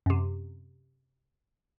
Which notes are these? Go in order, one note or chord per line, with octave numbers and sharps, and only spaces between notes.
F#2 C3